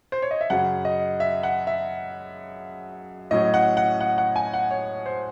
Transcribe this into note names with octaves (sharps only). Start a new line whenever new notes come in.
C5
C#5
D#5
E5
F#2 C#3 F#3 F#5
D#5
E5
F#5
E5
A2 F#3 C#4 D#5
F#5
F#5
F#5
F#5
G#5
F#5
C#5
C5